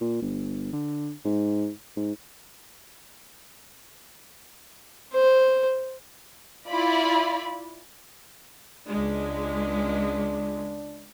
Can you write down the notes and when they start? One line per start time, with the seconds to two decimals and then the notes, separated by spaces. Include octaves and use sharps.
0.01 A#2
0.22 G1
0.73 D3
1.25 G#2
1.97 G#2
5.13 C5
6.68 E4 F4 D5 B5
8.87 C#2 G#3 D4